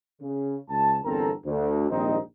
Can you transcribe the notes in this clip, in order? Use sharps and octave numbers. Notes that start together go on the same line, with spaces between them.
C#3
C#2 A5
G1 E2 C4 A4 A#4 A#5
D2
A#1 D#2 G#2 G3 C4 D#4